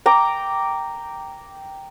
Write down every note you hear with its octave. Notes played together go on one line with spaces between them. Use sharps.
G5 A#5 D6